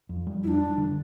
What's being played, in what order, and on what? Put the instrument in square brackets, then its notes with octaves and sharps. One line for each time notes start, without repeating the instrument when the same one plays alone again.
[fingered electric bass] F2
G3
[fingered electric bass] F2 [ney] D4 E4
[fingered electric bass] G3
D3